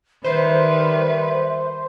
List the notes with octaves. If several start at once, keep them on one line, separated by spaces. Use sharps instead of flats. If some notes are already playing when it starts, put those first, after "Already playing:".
D#3 G3 B4 C5 E5